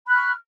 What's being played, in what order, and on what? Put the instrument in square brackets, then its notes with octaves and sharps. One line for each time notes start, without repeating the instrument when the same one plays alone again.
[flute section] B5
F#6
F6
C#6